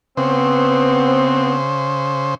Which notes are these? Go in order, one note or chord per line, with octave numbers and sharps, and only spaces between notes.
C#3 B3 C4 C5